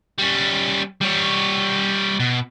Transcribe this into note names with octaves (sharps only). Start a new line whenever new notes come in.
G3 C#4
G3 C#5
B2